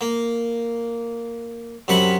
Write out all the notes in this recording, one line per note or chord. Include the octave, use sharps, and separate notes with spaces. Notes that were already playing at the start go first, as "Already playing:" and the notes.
A#3
F#2 C3 F#5 B5